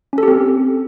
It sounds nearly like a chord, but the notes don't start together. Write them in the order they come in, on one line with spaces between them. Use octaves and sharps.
C#4 A4 G4 C4